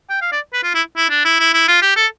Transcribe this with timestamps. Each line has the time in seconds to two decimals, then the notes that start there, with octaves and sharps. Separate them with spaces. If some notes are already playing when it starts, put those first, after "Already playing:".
0.09 G5
0.21 F5
0.32 D5
0.53 B4
0.63 F4
0.74 E4
0.97 E4
1.10 D4
1.25 E4
1.40 E4
1.53 E4
1.68 F4
1.82 G4
1.96 A4